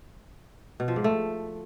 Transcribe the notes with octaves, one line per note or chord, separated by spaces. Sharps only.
B2
F3
G#2
A3